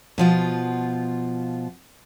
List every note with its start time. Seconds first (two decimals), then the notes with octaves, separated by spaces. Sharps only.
0.18 B2 F3 F4